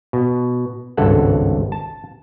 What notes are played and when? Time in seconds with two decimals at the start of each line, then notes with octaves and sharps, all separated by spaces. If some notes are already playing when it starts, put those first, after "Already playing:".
0.13 B2
0.97 G#1 C#2 G2 A4 E5 F#5
1.72 A5